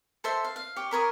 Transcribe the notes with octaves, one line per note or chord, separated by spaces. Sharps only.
A4 C5 E5
F5
F5
G4 C#5 D6
E4 A#4 C#5 D#6